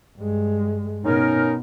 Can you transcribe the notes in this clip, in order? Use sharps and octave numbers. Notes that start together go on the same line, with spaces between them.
G2 G#3
B2 C#4 D#4 A#4